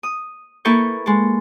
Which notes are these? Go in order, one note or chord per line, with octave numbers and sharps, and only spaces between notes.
D#6
A#3 E4 A4 B4 C#6 G6
G#3 A4